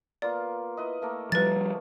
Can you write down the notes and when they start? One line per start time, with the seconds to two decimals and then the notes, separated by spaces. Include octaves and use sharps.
0.22 A#3 B3 F4 D5
0.77 E4 B4 D#5
1.02 A3 A#3 A4
1.32 F3 G3 B4 A6